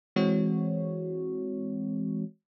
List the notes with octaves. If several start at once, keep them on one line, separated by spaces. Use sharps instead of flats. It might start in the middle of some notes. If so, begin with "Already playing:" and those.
E3 G#3 C4 F#4 C#5